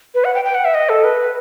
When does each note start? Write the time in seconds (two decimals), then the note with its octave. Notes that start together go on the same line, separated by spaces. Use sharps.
0.15 B4
0.25 F#5
0.35 G5
0.45 G5
0.55 F#5
0.65 E5
0.74 D#5
0.89 A4
1.04 B4